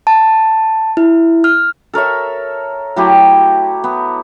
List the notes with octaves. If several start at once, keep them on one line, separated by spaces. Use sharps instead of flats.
A5
E4
F6
A4 A#4 C#5 E5
F#3 A3 E4 G4
B3